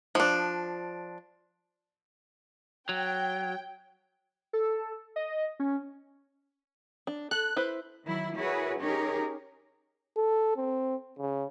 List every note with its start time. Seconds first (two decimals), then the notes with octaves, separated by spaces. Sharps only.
0.15 F3 D4
2.89 F#3 G5
4.53 A4
5.16 D#5
5.60 C#4
7.07 D4
7.31 A4 F#6
7.56 E4 B4 C5
8.05 D#3 F#3 E4
8.38 E4 F#4 G#4 A#4 B4 C#5
8.82 C#4 D#4 G4 G#4 A#4 C#5
10.17 A4
10.56 C4
11.19 C#3